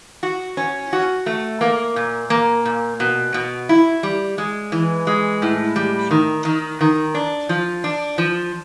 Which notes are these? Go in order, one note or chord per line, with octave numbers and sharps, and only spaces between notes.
F#4
C#4
F#4
A3
A#3
A#2
A#3
A#2
B2
B2
E4
G3
G#3
E3
G#3
A2
G3
D#3
D#3
D#3
D4
F3
D4
F3